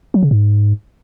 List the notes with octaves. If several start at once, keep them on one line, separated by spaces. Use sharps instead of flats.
F#3
C#3
G#2